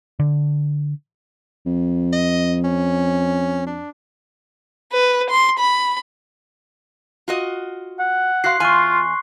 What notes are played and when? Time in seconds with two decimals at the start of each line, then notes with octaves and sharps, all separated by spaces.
0.19 D3
1.66 F2
2.12 D#5
2.64 C#4
3.67 D4
4.93 B4
5.30 C6
5.59 B5
7.28 F4 F#4 D#5
7.99 F#5
8.44 F#4 F5 C6 F#6 C7
8.60 E2 F4 F5 G#5 C6 C#6